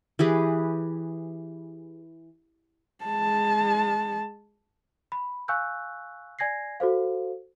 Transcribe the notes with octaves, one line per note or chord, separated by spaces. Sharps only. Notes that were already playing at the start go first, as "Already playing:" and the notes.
E3 G4 G#4 B4
G#3 A5
B5
F5 G#5 C#6 E6 F#6 G6
D5 G#5 G#6 A#6 C7
F#4 A4 C5 F5